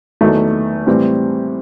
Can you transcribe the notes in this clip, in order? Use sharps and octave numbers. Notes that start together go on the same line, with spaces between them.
E2 D#3 F#3 A3
A2 E3 G3 C4